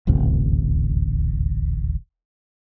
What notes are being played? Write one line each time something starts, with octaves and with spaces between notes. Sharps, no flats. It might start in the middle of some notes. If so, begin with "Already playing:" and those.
D#1 A1 D2 C3